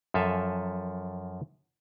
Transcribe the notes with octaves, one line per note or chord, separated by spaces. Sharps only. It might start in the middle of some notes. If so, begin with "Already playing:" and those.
F#2 F3 A4 E5 F5 G#5